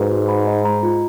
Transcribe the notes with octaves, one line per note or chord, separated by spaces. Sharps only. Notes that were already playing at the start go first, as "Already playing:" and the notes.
Already playing: G#2 F#4 B4
F#4
B5
D#5
A#5
F4